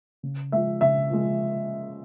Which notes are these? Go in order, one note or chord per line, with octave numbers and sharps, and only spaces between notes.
C#3
F3 G#3 E5
C#3 E5
F3 G#3